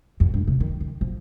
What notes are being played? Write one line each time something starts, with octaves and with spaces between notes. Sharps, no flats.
F2
G2
C3
D#3
D#3
F3